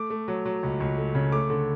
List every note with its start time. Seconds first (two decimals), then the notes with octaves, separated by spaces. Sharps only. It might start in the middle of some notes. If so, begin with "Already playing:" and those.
Already playing: A3 D6
0.10 A3
0.28 F#3
0.45 F#3
0.63 C#2
0.80 C#2
0.98 A3
1.14 C#3
1.32 A3 D6
1.50 D3